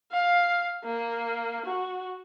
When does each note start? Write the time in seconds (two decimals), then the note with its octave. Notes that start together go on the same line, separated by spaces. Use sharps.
0.12 F5
0.84 A#3
1.66 F#4